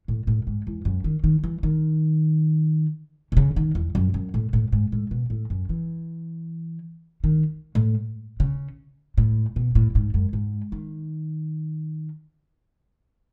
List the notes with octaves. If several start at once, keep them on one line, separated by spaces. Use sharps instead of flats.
A2
A2
G#2
E2
F#2
D#3
D#3
E3
D#3
B2
C#3
D#3
E2
F#2
F#2
A2
A2
G#2
A2
B2
A2
F#2
E3
D#3
A2
C#3
A2
B2
A2
G#2
F#2
G#2
D#3